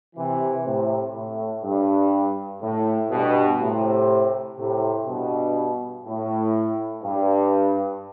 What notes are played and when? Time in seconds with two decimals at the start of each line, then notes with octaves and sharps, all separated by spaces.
0.16 C3 E3
0.65 A2 C3
1.15 A2
1.64 G2
2.62 A2
3.11 G2 B2
3.60 A2 C3
4.58 A2 C3
5.07 G2 B2
6.05 A2
7.04 G2